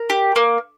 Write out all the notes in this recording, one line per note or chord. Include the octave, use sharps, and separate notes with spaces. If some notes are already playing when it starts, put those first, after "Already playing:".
Already playing: A#4
G4
A#3